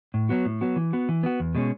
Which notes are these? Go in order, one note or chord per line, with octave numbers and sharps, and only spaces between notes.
A2
F#3 B3 F#4
A2
F#3 B3 F#4
E3
B3 F#4
E3
B3 F#4
E2
B2 G#3 C#4